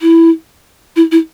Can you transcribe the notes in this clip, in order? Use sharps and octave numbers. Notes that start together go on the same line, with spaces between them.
E4
E4
E4